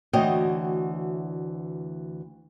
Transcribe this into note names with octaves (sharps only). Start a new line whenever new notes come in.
D2 E3 F#4 C#5 D#5 G5